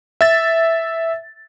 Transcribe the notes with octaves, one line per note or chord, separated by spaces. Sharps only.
E5 A6